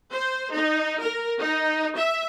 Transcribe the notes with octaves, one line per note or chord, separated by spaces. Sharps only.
C5
D#4
A#4
D#4
E5